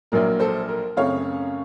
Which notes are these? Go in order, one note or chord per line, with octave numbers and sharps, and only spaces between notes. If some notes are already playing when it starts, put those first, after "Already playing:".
A#1 A#2 F#3 A#3 A#4
A4 C5
A#4
F#2 C#3 A3 C4 C#5 F5